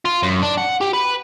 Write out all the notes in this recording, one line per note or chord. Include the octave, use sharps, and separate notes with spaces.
F4
F#2
D4
F#5
G4
B4